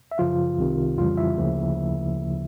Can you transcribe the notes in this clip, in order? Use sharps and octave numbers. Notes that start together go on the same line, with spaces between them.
E5
F#2 C#3 F3 F4 F5
C2 C3 D#3
F2 C#3 E3 G3 F4 F5
E4 E5
D2 C#3 F3 A#3